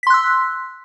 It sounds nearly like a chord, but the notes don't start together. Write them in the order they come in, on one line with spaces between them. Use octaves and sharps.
B6 C6 F#6 E6